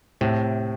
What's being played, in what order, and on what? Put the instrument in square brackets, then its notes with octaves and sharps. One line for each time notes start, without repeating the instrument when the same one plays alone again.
[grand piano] A2 [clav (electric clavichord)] C3